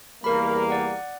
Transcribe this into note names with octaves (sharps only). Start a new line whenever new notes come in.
E2 G3 A#3 A#4 B5
D5 F#5